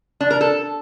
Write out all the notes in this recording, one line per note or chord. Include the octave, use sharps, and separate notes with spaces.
D4
A#4
A4